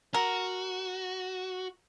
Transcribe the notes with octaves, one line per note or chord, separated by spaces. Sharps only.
F#4 A#4